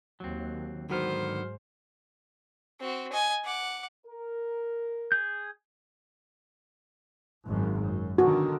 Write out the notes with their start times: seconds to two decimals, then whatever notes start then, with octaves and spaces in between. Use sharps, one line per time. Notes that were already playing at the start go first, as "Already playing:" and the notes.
0.20 D#2 F#3 C4
0.90 G#2 D3 D#3 F#3 B3 F#4 C5 F6
2.80 C4 F#4
3.12 D#5 G#5
3.44 F#5 D6
4.05 A#4
5.12 G#4 G6
7.45 G#1 F#2
7.81 F#2
8.18 D3 D#3 F#4